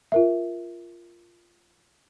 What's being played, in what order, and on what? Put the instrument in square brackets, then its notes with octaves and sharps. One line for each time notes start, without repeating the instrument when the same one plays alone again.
[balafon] F4 A#4 E5